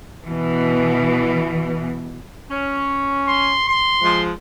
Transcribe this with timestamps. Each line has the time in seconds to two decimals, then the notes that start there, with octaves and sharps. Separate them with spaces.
0.25 B2 E3
2.49 C#4
3.28 C6
3.68 C6
4.01 F3 G#3